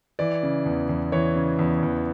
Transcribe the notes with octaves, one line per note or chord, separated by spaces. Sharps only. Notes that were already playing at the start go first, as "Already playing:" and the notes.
E3 D5
C#3
E2
E2
E3 C#5
C#3
E2
E2